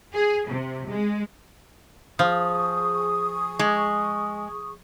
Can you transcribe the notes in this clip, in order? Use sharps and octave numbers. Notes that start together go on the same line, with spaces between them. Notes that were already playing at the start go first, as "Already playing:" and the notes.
G#4
C3
G#3
F3 G#4 C#6 D#6
G#3